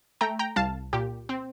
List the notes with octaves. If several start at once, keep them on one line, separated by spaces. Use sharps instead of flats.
A3 G5 A#5
G5 A#5
C2 F5 A5
A#2 G4
C4